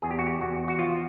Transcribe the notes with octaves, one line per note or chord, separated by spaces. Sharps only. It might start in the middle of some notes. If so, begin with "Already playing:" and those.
E2 G#4
G4
F#4
G4
E2 F#4
F#4
F3 F4